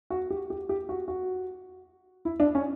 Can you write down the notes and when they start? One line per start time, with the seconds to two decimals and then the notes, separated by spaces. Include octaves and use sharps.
0.10 F#4
0.30 G4
0.50 G4
0.69 G4
0.89 F#4
1.08 F#4
2.25 E4
2.40 D4
2.55 C#4